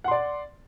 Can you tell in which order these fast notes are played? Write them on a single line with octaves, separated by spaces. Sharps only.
F#5 C6 D5